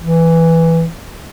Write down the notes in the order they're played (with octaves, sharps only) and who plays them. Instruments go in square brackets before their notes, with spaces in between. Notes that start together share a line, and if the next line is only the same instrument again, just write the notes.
[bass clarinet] E3